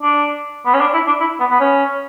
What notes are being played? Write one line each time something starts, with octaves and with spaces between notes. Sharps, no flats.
D4
B3
C#4
D4
E4
D4
E4
B3
B3
C#4